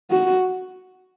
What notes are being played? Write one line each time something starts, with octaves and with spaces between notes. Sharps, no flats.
F#4